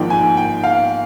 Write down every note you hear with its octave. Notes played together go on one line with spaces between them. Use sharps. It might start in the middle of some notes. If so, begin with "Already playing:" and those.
Already playing: G#1 G#2 F3 A#3 D#4 G5
G#5
G5
F5